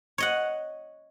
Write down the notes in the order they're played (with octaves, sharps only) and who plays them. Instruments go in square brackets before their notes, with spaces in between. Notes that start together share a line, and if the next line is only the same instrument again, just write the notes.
[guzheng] C#5 D#5 F#5